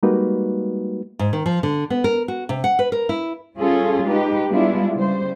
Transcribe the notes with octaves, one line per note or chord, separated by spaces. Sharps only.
G3 G#3 A#3 D#4 F#4 B4
G#2
D#3
F3
D3
B3
A#4
F#4
C3
F#5
B4
A#4
E4
G3 C#4 F4 G#4 A4
G#3 D#4 G4 B4
G3 G#3 B3 D4 E4 F4
C#3 G3 C5